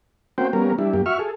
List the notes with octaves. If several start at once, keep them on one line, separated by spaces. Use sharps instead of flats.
A#3 C4 C#4 F#4 C5 G5
G3 A#3 B3 C#4 A#4
G3 D4 E4
F#2 A#3 G4
F#4 E5 C#6 F6
G#4 A4